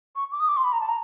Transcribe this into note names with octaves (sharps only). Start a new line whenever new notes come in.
C#6
D6
D#6
D6
C6
B5
A#5
A5
A#5